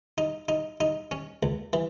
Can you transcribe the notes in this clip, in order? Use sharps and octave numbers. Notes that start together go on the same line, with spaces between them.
D#4
D#4
D#4
C#4
C#2
E3